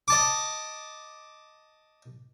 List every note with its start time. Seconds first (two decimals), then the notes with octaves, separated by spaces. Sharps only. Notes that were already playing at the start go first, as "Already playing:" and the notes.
0.08 D#5 A5 D6